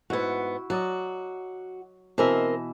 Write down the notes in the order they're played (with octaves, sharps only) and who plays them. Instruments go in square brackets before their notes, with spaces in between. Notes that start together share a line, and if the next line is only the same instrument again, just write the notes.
[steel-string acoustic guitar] G#2 B3 [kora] E4 F#4
[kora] F#3 D5 D#5 [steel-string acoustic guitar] F#4
[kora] B2 E3 E5 [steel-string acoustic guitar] C4 A#4 D#5